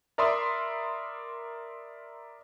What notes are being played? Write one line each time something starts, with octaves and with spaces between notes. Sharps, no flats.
A#4 D5 E5 B5 C6 D#6